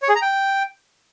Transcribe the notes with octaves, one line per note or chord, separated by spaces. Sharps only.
C#5
G#4
A#5
G5